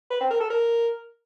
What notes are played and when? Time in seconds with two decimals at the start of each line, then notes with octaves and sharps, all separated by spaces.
0.11 B4
0.21 C4
0.31 A#4
0.40 A4
0.50 A#4